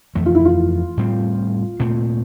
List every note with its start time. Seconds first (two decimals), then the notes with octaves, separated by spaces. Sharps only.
0.15 F2 E3 A3
0.26 F4
0.35 E4
0.45 F4
0.97 A2 G3 C4
1.80 A#2 A3 C4